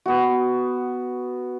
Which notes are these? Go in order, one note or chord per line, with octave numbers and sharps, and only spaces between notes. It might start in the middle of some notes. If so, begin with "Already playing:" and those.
B3 F#4